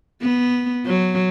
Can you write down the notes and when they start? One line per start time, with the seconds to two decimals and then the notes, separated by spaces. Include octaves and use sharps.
0.21 B3
0.86 F#3